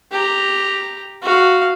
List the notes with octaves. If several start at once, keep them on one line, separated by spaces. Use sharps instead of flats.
G4 A#5
F#4 F5